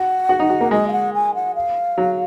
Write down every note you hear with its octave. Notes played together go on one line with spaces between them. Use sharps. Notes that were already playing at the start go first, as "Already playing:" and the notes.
Already playing: F#4 F#5
F#4
D#4
F#4
A#3
G#3 D#5
F5
F#5
G#5
F#5
F5
F#3